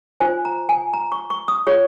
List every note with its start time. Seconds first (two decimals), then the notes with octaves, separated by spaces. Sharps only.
0.20 F4 C5 G#5
0.45 A#5
0.69 G#5
0.93 A#5
1.12 C#6
1.30 C#6
1.48 D#6
1.67 F4 G#4 C#5 C#6